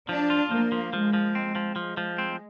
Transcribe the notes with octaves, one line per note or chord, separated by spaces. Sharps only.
F3 D4
F4
F3 A#3
F3
F3 G#3
F3
C4
F3
F3 G#3
F3
C4